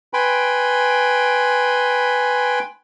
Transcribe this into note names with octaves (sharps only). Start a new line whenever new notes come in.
B4 G5 G#5 B5 C6